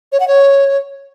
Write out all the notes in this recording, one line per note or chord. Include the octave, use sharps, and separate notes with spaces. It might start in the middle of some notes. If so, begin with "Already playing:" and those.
C#5
F#5
C#5